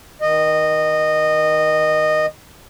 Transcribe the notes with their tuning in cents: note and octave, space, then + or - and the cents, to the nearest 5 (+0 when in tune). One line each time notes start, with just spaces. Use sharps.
D#3 +20 D#5 -15